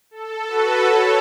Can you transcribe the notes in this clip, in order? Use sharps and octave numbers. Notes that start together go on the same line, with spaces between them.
A4
F#4 B4
A4 C#5